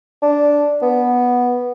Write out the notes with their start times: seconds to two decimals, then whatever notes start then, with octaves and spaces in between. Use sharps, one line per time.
0.22 D4
0.82 B3